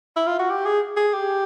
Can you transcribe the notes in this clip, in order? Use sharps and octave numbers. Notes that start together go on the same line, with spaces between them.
E4
F4
F#4
G4
G#4
G#4
G4